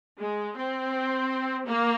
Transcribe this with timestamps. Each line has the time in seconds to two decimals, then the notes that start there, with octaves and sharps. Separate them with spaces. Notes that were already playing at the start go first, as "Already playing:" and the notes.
0.20 G#3
0.57 C4
1.67 A#3